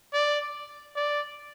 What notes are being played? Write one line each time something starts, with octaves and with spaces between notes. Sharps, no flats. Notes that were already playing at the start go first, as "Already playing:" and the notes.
D5
D5